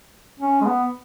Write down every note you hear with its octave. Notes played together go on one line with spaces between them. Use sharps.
C#4
G#3
B3